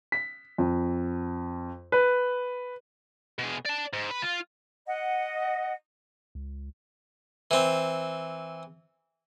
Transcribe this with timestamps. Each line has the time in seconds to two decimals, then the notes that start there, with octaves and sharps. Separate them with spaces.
0.12 B6
0.58 F2
1.92 B4
3.39 B2 G#4
3.66 D5 A5
3.93 G#2
4.11 B4
4.22 F4
4.87 D#5 F#5
6.35 C#2
7.51 E3 C4